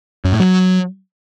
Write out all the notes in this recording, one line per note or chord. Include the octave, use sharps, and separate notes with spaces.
F#2
A2
F#3